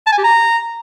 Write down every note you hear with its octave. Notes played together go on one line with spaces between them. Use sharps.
A5
G#5
G4
A#5